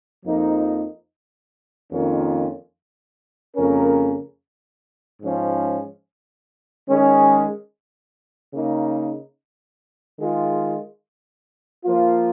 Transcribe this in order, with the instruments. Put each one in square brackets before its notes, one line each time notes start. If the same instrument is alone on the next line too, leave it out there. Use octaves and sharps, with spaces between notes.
[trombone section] F2 F3 A#3 D#4
F2 D#3 A#3 C#4 F4
F2 C#3 A#3 C#4 A#4
G#2 F3 C#4
D#3 G#3 C#4 G#4
C#3 A#3 D#4
D#3 G#3 F4
F3 A#3 F4